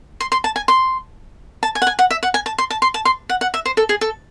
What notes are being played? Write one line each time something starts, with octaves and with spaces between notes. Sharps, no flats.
C6
C6
A5
G#5
C6
A5
G#5
F#5
G#5
F#5
E5
F#5
G#5
A5
C6
A5
C6
A5
C6
F#5
F#5
E5
C5
A4
G#4
A4